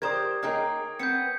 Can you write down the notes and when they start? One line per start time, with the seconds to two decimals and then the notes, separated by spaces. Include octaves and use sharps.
0.02 G4 A#4 C5 D5 D#6 G#6
0.43 A#3 D#4 G#4 A#4 C#5 G5
0.99 B3 C4 G6 C#7